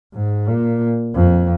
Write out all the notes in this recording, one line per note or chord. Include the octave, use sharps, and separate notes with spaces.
G#2
A#2
F2